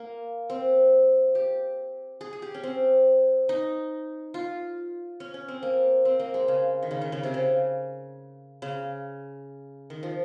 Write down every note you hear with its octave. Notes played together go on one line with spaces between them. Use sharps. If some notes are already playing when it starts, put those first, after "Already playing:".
Already playing: A#3
C4
G4
G#4
G#4
G4
C#4
C4
D#4
F4
C#4
C#4
C4
A#3
C4
A#3
G#3
C#3
D#3
C#3
D#3
C#3
C3
C#3
C#3
D#3
F3